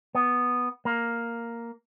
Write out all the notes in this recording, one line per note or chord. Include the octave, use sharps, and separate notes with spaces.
B3
A#3